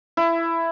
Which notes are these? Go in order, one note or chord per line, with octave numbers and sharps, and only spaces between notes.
E4